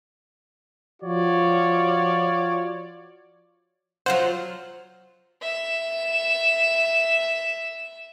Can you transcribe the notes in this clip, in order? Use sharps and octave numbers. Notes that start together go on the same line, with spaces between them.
F3 F4 F#4 C#5 D5
F#3 F4 C5 F#5
E5 E7